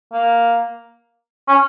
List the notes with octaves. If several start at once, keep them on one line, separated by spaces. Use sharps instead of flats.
A#3
C#4